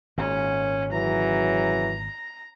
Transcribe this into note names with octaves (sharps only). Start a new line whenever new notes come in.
G#1 A#2 C#4
C#3 E3 F#3 A#5